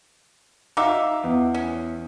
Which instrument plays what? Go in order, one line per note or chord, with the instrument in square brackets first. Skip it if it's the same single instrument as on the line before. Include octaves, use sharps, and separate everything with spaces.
[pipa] D#4 E5 [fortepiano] F5 D6
[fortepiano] E2
[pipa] C#4